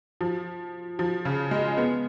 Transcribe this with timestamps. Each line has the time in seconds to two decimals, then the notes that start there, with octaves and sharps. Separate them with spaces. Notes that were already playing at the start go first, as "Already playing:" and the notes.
0.21 F3
0.99 F3
1.25 C#3
1.51 G#3
1.78 B3